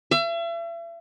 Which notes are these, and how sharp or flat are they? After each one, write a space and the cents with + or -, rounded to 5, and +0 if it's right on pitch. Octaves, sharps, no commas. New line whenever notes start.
E5 +40